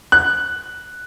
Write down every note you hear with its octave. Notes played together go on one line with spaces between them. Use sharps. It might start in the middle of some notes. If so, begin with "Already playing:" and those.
F#6